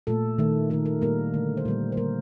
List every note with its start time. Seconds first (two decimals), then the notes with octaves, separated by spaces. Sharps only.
0.07 A#2 A3 A4
0.38 D#3 A3
0.70 A3 A#4
0.73 D#3
0.86 A#4
1.02 A#2 G3 A#3 A#4
1.34 D3 A3
1.57 C5
1.65 A#2 G3 A#3 A#4
1.92 C5
1.97 D3 G3 A#3 A#4